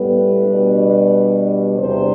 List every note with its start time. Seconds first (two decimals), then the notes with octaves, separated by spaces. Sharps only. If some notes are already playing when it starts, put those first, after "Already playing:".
Already playing: A2 G3 B3 B4
0.45 B2 G3 D4
1.78 E2 C3 G3 D4 C5